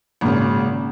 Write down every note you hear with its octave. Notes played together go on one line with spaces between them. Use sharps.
G#1 A#2 C#3